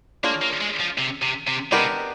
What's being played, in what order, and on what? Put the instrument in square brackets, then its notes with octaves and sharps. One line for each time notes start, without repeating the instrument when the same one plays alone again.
[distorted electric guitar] A#3 [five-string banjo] D4 F4 G#4 C#5
[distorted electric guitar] A#3
G#3
F3
C3
C3
C3
[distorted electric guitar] C3 [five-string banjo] G#3 B3 D4 G4 A#4